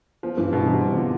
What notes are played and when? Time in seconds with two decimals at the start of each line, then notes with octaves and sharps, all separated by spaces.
0.23 F3 B3
0.37 G2 E3
0.52 G2 B2
0.66 C3 E3
0.81 C3 B3
0.96 D3 F4